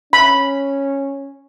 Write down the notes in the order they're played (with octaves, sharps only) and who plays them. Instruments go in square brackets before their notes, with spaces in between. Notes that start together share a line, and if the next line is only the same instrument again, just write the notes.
[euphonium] C#4 [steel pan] B5